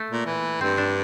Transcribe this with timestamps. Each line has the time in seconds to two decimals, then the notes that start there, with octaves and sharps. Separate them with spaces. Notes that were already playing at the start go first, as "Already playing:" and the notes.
Already playing: A3
0.10 A#2
0.27 E3
0.61 G2 C4
0.77 D4